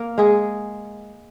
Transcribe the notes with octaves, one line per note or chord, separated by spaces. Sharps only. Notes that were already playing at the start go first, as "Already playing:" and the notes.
Already playing: A#3 A#4
G#3 G#4